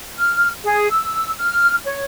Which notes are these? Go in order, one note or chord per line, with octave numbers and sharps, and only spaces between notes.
F6
G#4
E6
F6
C#5